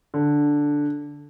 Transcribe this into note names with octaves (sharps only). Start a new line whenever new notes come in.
D3